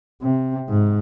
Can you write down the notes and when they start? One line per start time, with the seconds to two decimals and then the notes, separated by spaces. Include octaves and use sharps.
0.22 C3
0.69 G#2